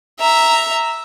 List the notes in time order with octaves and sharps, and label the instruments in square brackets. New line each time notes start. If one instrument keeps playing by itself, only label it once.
[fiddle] E5 A#5